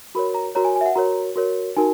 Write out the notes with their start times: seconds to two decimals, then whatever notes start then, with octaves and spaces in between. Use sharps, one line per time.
0.15 F#4 A#4 C#5 B5
0.34 A#5
0.55 F#4 A#4 C#5 A#5
0.65 G#5
0.76 G#5
0.81 E5
0.86 F#5
0.96 F#4 A#4 C#5 A#5
1.36 F#4 A#4 C#5
1.76 D#4 F#4 A#4 G#5